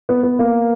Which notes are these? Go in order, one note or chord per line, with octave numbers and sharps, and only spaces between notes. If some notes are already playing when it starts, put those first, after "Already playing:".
B3
B3
A#3